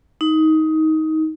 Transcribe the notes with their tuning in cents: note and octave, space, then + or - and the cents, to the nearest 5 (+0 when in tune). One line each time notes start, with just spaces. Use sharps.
D#4 +20